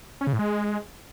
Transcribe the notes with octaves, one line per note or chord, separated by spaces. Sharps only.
C#4
C#3
A2
G#3